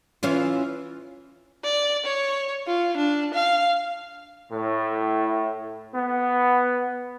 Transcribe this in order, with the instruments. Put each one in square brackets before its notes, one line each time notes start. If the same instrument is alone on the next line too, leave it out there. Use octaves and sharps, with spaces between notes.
[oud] E3 C#4 F4
[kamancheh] D5
C#5
F4
D4
F5
[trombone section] A2
B3